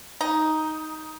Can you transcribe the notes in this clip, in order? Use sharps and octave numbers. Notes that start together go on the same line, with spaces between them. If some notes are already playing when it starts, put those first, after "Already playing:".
D#4